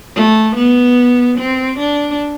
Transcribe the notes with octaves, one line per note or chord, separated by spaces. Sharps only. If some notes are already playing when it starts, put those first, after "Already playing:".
A3
B3
C4
D4